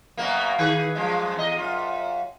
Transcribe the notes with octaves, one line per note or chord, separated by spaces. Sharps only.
F#2 B2 A#3
D#3 G#4 B4
F#2 F3 G#3
E2 D#5
F#2 F4